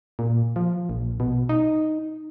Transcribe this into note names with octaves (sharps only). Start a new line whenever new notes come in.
A#2
F3
A#1
B2
D#4